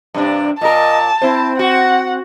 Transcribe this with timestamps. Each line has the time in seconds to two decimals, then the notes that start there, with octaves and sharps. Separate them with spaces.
0.14 G2 C3 D4
0.61 A#2 A#4 D#5 A5
1.22 C4 E4 C5
1.59 F#4 F#5